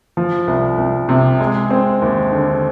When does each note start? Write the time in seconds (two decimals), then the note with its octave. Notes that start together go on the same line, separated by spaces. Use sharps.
0.17 F3
0.48 C2
0.78 C2
1.09 C3
1.40 G#3
1.71 C4
2.02 D#2
2.32 D3